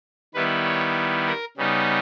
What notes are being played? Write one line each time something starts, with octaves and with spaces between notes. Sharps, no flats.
D#3 G3 B3 E4 B4
C#5
A#4
C#3 G3 B3 D#4